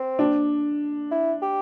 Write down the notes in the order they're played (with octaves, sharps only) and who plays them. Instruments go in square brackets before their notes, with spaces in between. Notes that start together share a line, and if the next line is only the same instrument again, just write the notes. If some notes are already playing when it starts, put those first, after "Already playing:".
Already playing: [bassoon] C4
[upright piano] D4
[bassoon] E4
G4